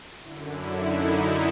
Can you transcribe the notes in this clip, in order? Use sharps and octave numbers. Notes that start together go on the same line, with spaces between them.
F#2 D3 E4
E4
D#4